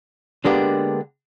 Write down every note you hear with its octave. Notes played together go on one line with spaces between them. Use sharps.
D3 G#3 A#3 B3 D4 G4